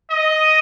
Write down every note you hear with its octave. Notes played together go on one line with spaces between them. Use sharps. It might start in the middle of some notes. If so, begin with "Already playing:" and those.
D#5